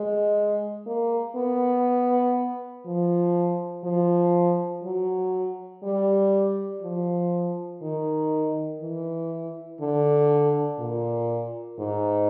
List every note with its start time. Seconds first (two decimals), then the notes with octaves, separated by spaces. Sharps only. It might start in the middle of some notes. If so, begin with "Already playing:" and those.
Already playing: G#3
0.86 A#3
1.36 B3
2.85 F3
3.84 F3
4.83 F#3
5.83 G3
6.82 F3
7.82 D#3
8.81 E3
9.81 D3
10.79 A#2
11.78 G#2